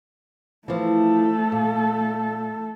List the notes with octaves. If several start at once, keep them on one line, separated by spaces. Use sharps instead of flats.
E3 F3 A3 A4
A#2